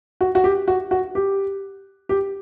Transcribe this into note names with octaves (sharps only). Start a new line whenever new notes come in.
F#4
F#4
G4
F#4
F#4
G4
G4